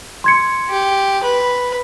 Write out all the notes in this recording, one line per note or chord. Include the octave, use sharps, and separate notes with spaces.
C6 G#6 C#7
G4
B4